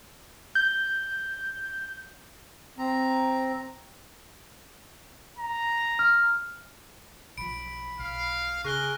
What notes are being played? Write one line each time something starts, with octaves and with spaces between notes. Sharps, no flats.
G6
C4 A#5
A#5
F6
B1 F3 B5 D7
B1 F5
C#3 G#4 A#4 C#6 F#6 G7